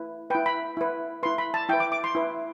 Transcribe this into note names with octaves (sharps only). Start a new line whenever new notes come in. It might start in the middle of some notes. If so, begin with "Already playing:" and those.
Already playing: E4 B4
E4 B4 G5
B5
E4 B4
E4 B4 C6
B5
A5
E4 B4 G5
D6
D6
C6
E4 B4